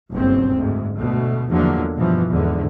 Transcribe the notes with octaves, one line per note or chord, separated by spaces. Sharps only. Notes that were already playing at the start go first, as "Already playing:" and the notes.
F#1 B1 G2 C4
D2 G#2
D2 B2 A3
E2 D3 F3 F#3 G#3 A#3
G2 B2 E3 F3 B3
E2 G#2 D3